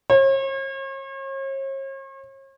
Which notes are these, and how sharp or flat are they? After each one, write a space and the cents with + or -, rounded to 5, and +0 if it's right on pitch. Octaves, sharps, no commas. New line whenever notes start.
C#5 -45